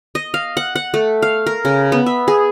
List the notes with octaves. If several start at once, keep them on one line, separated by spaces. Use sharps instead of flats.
D#5
F5
F#5
F#5
A3
F5
A#4
C#3
B3
E5
G#4